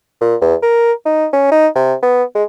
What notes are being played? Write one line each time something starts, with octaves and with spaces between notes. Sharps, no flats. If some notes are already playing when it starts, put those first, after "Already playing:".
A#2
E2
A#4
D#4
C#4
D#4
C3
B3
G#3